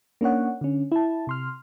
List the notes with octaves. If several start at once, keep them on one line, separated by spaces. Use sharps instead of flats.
A#3 C#4 D4 C#5 F#5
D3 C#4
E4 A5
C3 C6 F6